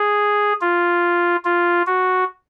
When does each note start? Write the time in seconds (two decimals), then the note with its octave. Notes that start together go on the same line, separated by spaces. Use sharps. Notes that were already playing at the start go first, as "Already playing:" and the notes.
Already playing: G#4
0.61 F4
1.45 F4
1.87 F#4